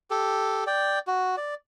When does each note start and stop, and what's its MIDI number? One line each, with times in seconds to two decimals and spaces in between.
0.10 0.64 67
0.10 0.64 69
0.67 0.99 74
0.67 0.99 79
1.07 1.36 66
1.37 1.54 74